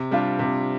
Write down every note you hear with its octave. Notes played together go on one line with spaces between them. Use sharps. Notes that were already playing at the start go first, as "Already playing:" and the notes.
Already playing: C3
G3 D4 F4
C3